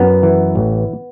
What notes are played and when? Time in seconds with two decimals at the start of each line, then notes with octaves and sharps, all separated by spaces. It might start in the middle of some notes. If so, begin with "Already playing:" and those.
Already playing: F#2 B3
0.23 E3
0.55 A1